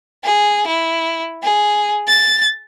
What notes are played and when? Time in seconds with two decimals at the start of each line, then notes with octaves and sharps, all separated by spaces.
0.24 G#4
0.67 E4
1.43 G#4
2.08 A6